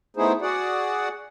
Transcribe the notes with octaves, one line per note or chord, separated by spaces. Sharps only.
A3 B3 D#4 E4 G#4 C5
F#4 G#4 D5 F#5